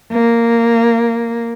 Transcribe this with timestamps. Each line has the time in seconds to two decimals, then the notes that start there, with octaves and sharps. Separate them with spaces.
0.12 A#3